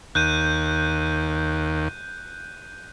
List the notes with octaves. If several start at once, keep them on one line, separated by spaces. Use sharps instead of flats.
D#2 F#6 G6 D#7